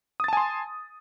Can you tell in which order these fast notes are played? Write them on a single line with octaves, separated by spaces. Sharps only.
D#6 A6 A5 G#5 C6